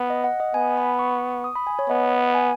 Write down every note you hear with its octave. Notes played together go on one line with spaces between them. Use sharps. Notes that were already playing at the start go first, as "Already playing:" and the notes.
Already playing: B3
D#5
F#5
D#5
B3 G#5
B5
C#6
D#6
B5
G#5
C#5
B3 D#5
G#5